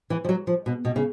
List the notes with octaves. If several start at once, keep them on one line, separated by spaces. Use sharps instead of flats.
E3
F3
F#3
F3
B2
B2
C#3